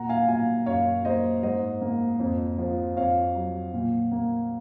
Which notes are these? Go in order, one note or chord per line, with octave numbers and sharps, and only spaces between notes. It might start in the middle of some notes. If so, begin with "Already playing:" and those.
Already playing: A#2 F#5 A#5
F5 G#5
A#2 F5 G#5
F#2 C#5 F5
A#3 C5 D#5
G#2 C5 D#5
A#3
F2
F3
F2 C#5 F5
F#3
A#2
A#3